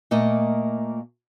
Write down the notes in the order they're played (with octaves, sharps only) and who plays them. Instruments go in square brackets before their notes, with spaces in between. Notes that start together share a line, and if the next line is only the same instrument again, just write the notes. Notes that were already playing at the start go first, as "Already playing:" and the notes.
[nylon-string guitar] A#2 A3 A#3 D#5